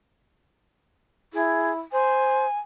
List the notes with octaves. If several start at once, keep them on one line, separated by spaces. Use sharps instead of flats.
E4 G#4
C5 G#5